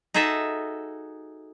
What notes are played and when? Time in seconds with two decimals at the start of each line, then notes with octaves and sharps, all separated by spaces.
0.14 D#4 F#4 G#4 A4 E5